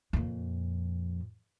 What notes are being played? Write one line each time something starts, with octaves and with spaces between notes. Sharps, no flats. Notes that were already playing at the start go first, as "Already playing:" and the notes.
F2 A#2